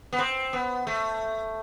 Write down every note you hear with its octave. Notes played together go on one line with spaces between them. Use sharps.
B3
C4
B3
A3